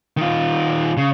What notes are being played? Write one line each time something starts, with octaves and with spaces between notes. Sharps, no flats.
D#3 F4
C#3